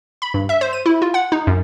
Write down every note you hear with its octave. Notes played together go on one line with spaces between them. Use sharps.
B5
G2
E5
C5
D#7
E4
F4
F#5
D#4
F#2